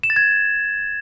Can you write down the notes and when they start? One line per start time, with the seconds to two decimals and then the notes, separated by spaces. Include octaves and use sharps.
0.03 E7
0.10 A6
0.16 G#6